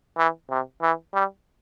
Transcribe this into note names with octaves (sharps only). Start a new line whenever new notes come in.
E3
C3
E3
G3